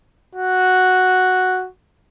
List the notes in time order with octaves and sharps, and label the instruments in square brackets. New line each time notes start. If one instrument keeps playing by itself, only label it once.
[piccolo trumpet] F#4